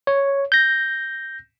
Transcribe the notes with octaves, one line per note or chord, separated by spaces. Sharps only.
C#5
G6 A#6